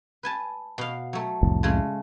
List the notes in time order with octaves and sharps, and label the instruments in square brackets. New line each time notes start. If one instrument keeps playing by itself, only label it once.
[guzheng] B4 G#5 A5
B2 F5
F#3 A3
[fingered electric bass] C2 F2 A2
[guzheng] C#3 G#3 A3